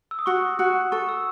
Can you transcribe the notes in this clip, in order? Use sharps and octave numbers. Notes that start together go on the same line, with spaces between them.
E6
D#6
F#4 C#6
F#4
A4 C#6
E6